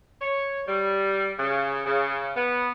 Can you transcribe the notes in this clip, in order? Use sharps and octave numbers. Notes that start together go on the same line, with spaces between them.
C#5
G3
C#3
C#3
B3